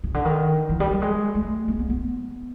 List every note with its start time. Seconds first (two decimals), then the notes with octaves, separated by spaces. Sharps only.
0.04 C#3
0.14 D3
0.25 D#3
0.69 E3
0.80 G3
0.92 G3
1.02 G#3
1.35 A3
1.68 A#3
1.79 B3
1.90 B3